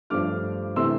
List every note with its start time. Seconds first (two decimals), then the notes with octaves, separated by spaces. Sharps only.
0.10 G2 F3 A3 D4 D6 F6
0.76 C3 E3 A3 C6 E6